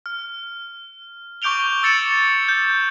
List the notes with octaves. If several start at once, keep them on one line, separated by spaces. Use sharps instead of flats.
F6
C#6 D6 G6 D7 F7 G7
E6 A6 C#7 E7
G6